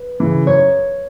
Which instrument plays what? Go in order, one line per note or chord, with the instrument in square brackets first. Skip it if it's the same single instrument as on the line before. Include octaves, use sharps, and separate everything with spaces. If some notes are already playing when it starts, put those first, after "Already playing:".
Already playing: [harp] B4
[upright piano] C#3 E3
[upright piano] F#2 [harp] C#5